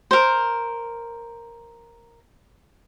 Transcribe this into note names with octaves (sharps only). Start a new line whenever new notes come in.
A#4 C5